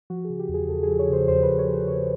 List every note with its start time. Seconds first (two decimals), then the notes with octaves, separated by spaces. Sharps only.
0.10 F3 F#4
0.24 G#4
0.30 C#3
0.39 G4
0.48 E2
0.54 G#4
0.69 E2 A4
0.83 F3 G#4
0.99 C#5
1.09 C#3 C5
1.28 E2 C5
1.43 B4
1.48 E2
1.59 C#5
1.68 F3
1.73 C5
1.88 C#3 C#5